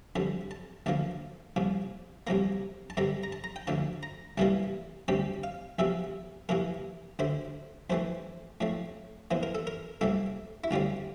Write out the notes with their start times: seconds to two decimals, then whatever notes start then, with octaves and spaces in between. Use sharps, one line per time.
0.16 F2 D3 G3 C4 A5
0.51 A5
0.86 D2 D3 F3 A#3 A5
1.56 C2 A#2 F3
2.27 C2 C3 F3 A#3 A#5
2.90 A5
2.97 G2 D3 G3 C4 A#5
3.23 A#5
3.32 A5
3.44 A#5
3.56 G5
3.67 D2 D3 F3 A5
4.03 A#5
4.38 C2 C3 E3 G3 A#3 A5
5.08 D2 C3 G3 C4 G5
5.43 F5
5.79 E2 C3 F3 C4 E5
6.49 F2 C3 E3 A#3 A#4
7.19 D2 D3 A3 C5
7.90 F2 E3 A3 C4 C5
8.61 A2 F3 A3 C4
9.31 E2 E3 A#3 C5
9.43 A#4
9.55 A4
9.67 A#4
10.01 C2 A#2 A3 C4 A4
10.64 E4
10.71 D2 D3 G3 C4 F4